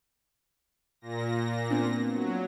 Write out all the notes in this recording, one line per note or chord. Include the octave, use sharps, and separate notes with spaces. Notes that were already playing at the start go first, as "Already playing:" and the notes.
A#2 A#6
B3 C4 D4
F#3